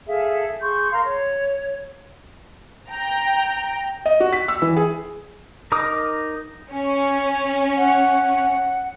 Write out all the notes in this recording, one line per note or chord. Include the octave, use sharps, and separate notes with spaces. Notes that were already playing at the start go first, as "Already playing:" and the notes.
G#4 A4 E5 F5
G#4 C6 C#6 G6
A#4 F5 A#5 C6
C#5
G5 A#5
D#5
F#4
B6
E6
E3
G#4
D#4 A#4 D6 D#6
C#4
F#5